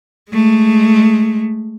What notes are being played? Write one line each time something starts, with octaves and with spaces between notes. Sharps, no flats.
G#3 A3